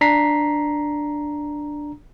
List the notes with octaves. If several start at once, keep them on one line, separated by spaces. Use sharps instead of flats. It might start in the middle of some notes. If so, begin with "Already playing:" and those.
D4 A#5 B6 C7